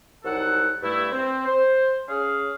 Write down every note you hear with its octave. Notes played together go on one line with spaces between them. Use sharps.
C2 F#3 D#4 A4 F#5
G2 A3 E4
C4
C5
C#4 G#4 F5